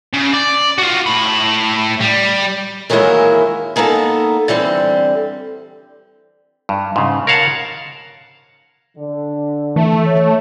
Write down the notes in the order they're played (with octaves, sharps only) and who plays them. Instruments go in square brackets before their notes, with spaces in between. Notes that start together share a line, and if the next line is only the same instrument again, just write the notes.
[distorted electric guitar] C#3
D5
F4 F#4
A2 B5
G3
[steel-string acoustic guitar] D#3 E3 F#3 G#3 A#3 E4
G#3 A#3 B3 D#4 A4
D3 E3 G3 C4
[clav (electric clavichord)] G2
G#2 C#3
A#4 C#5 F5 F#5 A5
[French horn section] D3
[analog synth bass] E3 [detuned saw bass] A3
[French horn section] C#5